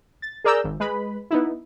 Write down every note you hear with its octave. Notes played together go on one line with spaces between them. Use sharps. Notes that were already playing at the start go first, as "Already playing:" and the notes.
A6
G#4 A#4 D5 A#5 E6 G6
G#1
G#3 B4 B5
B3 D#4 E4